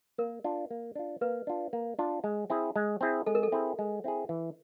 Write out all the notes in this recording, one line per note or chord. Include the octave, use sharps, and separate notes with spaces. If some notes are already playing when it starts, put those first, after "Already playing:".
A#3 A#4
D4 F4
A#3
D4 F4
A#3 B4
D4 F4
A#3
D4 F4
G#3
C4 E4 G#4
G#3
C4 E4 G#4
G#3 A4
A#4
A4
C4 E4 G#4
G#3
C4 E4 G#4
E3